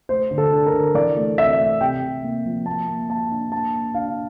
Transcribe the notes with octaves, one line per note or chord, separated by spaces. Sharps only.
A3 C5
D3
A4
D4
A#4
D3
E3 D5
A3
C4 E5
A3
C3 G5
C3
A#3
F3
A#3 A5
A#3
A#3 A5
D4
A#3 A5
D4
D4 F5